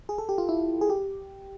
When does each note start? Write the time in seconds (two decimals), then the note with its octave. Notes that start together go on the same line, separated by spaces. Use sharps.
0.09 G#4
0.18 A4
0.29 G4
0.38 F4
0.49 E4
0.81 G#4
0.90 G4